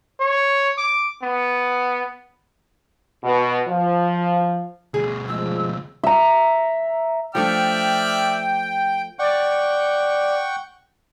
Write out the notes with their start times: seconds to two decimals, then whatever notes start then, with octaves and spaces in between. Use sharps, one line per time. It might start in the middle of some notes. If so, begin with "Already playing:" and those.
0.20 C#5
0.78 D6
1.23 B3
3.24 B2
3.68 F3
4.94 D2 B2 G#4
5.28 F3 G#3 E6
6.04 E5 A#5
7.35 F3 A3 D4 D5 E5 G5 F6
9.19 D5 F#5 G5 C#6